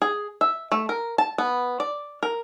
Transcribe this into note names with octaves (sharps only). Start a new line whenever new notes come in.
G#4
E5
A3
A#4
A5
B3
D5
A#4